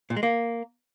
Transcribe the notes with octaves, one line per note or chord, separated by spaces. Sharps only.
A#2
G#3
A#3